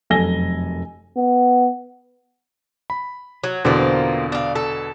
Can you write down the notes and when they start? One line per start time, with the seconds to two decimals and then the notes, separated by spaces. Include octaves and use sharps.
0.10 F1 F#2 A4 G#5 A#6 G7
1.17 B3
2.90 B5
3.44 F#3
3.64 E2 B2 D3 F3 A#3 C4
4.32 D4 F5
4.55 A4